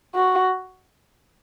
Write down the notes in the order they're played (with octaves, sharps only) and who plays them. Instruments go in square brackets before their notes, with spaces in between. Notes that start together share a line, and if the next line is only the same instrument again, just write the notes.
[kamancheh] F#4